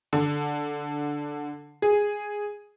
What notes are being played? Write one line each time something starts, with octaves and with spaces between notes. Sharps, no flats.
D3
G#4